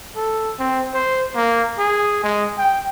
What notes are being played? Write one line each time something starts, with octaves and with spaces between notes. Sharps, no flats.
A4
C4
C5
A#3
G#4
G#3
G5